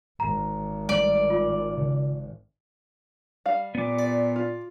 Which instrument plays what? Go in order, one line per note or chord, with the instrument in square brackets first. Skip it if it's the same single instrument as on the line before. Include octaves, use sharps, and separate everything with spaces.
[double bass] G#1 [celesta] A#5
[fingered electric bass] G3 A3 [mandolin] D5
[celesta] F4
[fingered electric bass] C#3
[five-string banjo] G3 F5
[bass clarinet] A#2 [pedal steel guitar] B3 D6
[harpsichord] D5
[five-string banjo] F4